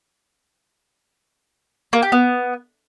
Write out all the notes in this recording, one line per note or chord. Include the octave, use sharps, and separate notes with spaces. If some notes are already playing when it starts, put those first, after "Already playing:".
A#3
G4
B3